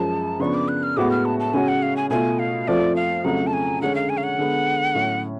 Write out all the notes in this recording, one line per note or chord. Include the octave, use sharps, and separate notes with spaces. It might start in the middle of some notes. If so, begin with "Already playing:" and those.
Already playing: F#2 F3 G#3 A5
C#3 F3 B3 D4 C#6
D6
F#6
F6
A2 G#3 B3 F#4 D6
F6
A5
A5
C#3 G#3 C#4 F#4 G#5
F#5
F5
G#5
B2 A3 F4 G#5
F5
F2 F3 A3 F4 D5
F5
F2 C#3 F#3 A3 F#5
A5
G#5
D3 G#3 C#4 F#5
F5
G#5
F5
F#5
D3 G#3 B3
A2 F#3 C#4